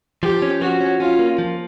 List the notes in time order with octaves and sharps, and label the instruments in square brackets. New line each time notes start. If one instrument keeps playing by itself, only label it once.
[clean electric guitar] F3 [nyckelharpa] G4
[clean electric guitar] C#4
[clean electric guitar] F3 [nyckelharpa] F#4
[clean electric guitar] C#4
[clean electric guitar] C#4 [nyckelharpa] F4
[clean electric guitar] A#3
F3